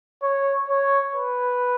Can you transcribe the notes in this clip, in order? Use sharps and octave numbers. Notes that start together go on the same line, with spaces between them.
C#5
C#5
B4